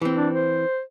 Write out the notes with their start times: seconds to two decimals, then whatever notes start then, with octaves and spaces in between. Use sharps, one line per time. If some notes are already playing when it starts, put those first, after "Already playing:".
0.02 E3 C4
0.17 D4
0.34 C5